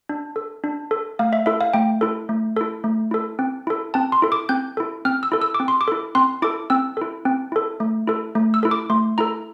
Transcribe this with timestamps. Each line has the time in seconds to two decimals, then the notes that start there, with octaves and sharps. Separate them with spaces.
0.09 D4
0.36 A4
0.64 D4
0.91 A4
1.19 A3 F5
1.33 E5
1.46 E4 A4 E5
1.61 F5
1.74 A3 G5
2.01 E4 A4
2.29 A3
2.56 E4 A4
2.84 A3
3.11 E4 A4
3.39 C4
3.67 E4 A4
3.94 C4 A5
4.12 C6
4.22 E4 A4
4.32 D6
4.49 C4 G6
4.77 E4 A4
5.05 C4 F6
5.23 E6
5.32 E4 A4
5.42 E6
5.54 D6
5.60 C4
5.68 C6
5.81 D6
5.88 E4 A4
6.15 C4 C6
6.42 E4 A4 D6
6.70 C4 E6
6.97 E4 A4
7.25 C4
7.52 E4 A4
7.80 A3
8.07 E4 A4
8.35 A3
8.54 E6
8.63 E4 A4
8.71 D6
8.90 A3 C6
9.18 E4 A4 A#5